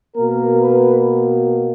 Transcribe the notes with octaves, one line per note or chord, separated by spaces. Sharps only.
B2 A#3 A#4
B4